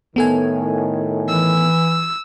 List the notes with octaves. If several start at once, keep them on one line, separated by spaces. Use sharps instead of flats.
A2 D#3 B3 A4 G#5
E3 E6